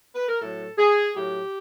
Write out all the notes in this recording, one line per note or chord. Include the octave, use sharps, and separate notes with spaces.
B4
A#4
A2 F#3 A4
G#4
A2 F#3 G4